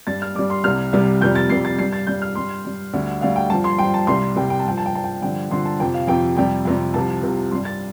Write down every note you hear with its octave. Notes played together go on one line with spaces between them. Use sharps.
G2 G3 A6
F6
G2 G3 D6
C6
C2 C3 G3 F6
C2 C3 G3
F2 C3 G3 G6
A6
F2 C3 G3 C7
A6
G2 G3 C7
A6
G2 G3 G6
F6
G2 G3 C6
G2 G3
D2 D3 G3
D2 D3 G3 F5
G5
G2 F3 A5
C6
G2 F3 G5
A5
C2 C3 G3 C6
C2 C3 G3 G5
G5
A5
G2 F3 G5
A5
G5
G2 F3 A5
G5
G2 D3 F3 G5
G2 D3 F3 C6
A5
F2 C3 F3 G5
F5
F2 C3 F3 G5
F2 C3 G3 G5
F2 C3 G3
C2 C3 F3 A5
C2 C3 F3
G2 G3 C6
A6